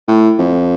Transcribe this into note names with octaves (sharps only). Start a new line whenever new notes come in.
A2
F2